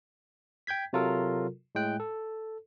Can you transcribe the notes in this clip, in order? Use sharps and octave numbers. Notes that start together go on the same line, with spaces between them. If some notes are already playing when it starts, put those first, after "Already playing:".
G5 G6 G#6 B6
C3 F#3 F4 F#4 A4 A#4
A2 G#3 G5 F#6
A4